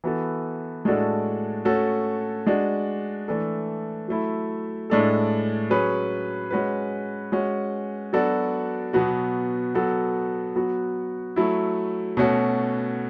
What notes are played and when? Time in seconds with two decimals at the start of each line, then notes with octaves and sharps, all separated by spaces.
0.04 E3 B3 F#4 A4
0.85 A2 G#3 D4 F#4 A4
1.65 A3 C#4 F#4 A4
2.47 G#3 D4 F#4
3.28 E3 A3 D4 A4
4.08 F#3 A3 E4
4.90 A2 G#3 D4 A4
5.70 F#3 C#4 G#4 B4
6.51 G#3 C#4 F#4 B4
7.32 G#3 C#4 F#4
8.13 F#3 B3 D4 F#4 A4
8.93 B2 F#3 B3 F#4
9.75 F#3 B3 F#4 A4
10.55 F#3 B3 F#4
11.36 F#3 A3 E4
12.17 B2 A3 C#4 F#4